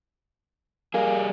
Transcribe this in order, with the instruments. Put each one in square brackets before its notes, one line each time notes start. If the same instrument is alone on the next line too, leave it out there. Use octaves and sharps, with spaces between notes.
[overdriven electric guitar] G3 G#4 [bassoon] A#3